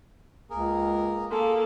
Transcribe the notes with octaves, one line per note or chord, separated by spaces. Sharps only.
C#2 A#3 G#4 A#4
A#3 F4 G#4 A4